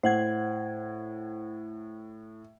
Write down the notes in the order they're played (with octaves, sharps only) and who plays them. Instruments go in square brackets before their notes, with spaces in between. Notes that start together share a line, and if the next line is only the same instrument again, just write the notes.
[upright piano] A2 [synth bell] C5 F#5 G#6